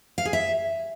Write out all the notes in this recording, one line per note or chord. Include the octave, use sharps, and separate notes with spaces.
F5
G#4
E5